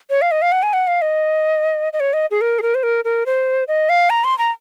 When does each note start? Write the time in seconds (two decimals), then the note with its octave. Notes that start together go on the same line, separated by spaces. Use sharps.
0.10 C#5
0.22 F5
0.31 D#5
0.42 F5
0.52 F#5
0.63 G#5
0.73 F#5
0.87 F5
1.02 D#5
1.93 D#5
2.00 C#5
2.13 D#5
2.31 G#4
2.41 A#4
2.59 G#4
2.62 A#4
2.75 C5
2.83 A#4
3.05 A#4
3.26 C5
3.68 D#5
3.89 F5
4.10 A#5
4.24 C6
4.38 A#5